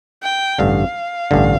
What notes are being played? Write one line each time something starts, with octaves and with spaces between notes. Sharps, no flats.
G5
A1 G2 D3 F5
A1 G2 D3